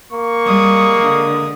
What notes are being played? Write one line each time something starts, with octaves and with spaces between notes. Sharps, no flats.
A#3 C#6
G3 G#3 D#6
D3